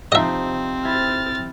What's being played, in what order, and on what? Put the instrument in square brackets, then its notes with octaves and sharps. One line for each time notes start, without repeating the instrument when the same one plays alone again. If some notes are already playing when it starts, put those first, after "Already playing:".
[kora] C3 F3 D#4 [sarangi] C4 [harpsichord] D#5 E5
[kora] E4 [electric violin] F6 A6